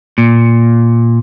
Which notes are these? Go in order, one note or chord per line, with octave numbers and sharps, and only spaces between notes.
A#2